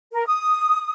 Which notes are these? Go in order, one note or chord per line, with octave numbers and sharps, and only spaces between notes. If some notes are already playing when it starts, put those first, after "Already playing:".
A#4
D#6